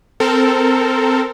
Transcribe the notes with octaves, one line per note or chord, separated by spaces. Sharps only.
C4 A4 A#4